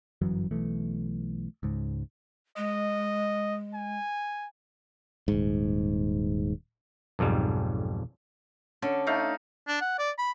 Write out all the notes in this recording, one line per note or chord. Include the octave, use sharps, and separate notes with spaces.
G1 F#2 E3 F#3
B1 E3 A3
C#2 G#2
G#3 D#5
G#5
D#1 G#2
B1 F2 G#2 G3
D3 C#4
A3 D#4 F5
D4
F#5
D5
B5